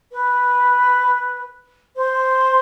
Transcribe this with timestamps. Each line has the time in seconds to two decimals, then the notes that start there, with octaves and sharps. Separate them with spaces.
0.12 B4
1.96 C5